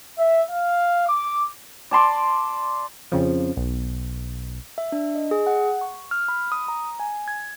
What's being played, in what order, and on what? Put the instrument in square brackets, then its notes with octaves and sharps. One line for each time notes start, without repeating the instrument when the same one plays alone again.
[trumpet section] E5
F5
D6
[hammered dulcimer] D5 A5 C6 D6
[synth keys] F2 C#3 F3
B1
[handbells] E5
D4
D#5
G#4
F#5
C#6
F6
B5
D#6
A#5
G#5
G#6